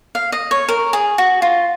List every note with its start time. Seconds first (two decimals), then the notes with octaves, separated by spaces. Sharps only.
0.15 F5
0.32 D#5
0.51 C#5
0.68 A#4
0.93 G#4
1.18 F#4
1.42 F4